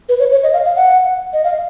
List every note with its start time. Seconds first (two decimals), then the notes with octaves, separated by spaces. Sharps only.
0.09 B4
0.20 C#5
0.31 C#5
0.43 D#5
0.53 F5
0.65 F5
0.76 F#5
1.33 D#5
1.44 F5